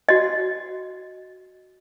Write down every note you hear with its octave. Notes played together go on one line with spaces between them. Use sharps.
F#4 D#5